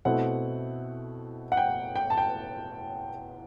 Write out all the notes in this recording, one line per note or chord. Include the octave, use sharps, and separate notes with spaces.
B2 A3 C4 E4 F#5
F#5
G5
G5
A5
G5